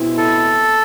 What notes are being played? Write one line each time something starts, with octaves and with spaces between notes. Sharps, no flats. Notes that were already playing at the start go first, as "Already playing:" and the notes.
Already playing: B2 G#3 C4 E4
A4